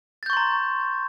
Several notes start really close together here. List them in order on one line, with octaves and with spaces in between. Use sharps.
A6 G6 C#6 C6 A#5